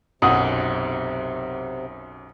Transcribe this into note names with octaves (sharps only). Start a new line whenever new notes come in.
B1 F#2 C3 F#5 D#6